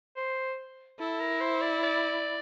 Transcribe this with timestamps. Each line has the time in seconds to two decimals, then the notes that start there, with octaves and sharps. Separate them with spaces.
0.16 C5
0.99 E4 A4
1.20 A#4
1.41 C5
1.61 D5
1.82 D5